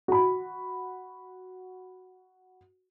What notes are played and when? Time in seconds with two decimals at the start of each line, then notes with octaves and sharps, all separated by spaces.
0.08 F#4 B5